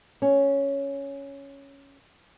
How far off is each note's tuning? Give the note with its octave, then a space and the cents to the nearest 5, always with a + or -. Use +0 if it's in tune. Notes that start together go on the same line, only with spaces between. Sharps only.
C#4 +5